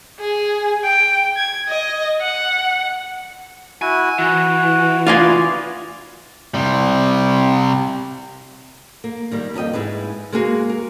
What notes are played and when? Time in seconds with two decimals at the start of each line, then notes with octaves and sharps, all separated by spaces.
0.20 G#4
0.84 G5
1.37 G#6
1.68 D#5
2.21 F#5
3.82 E4 F#4 G#5
4.18 E3 F#4
5.07 B3 F4 D5 F5 G#5 C6
6.54 C3 G3
9.04 A#3
9.31 D#3 G3 A#3
9.54 F2 D4 A4 D#5 G5
9.73 G#2 E4 G#4 B4
10.32 G#3 A#3 F#4 G#4 A#4
10.69 A#4